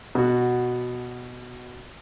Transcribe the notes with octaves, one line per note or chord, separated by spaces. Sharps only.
B2 F#4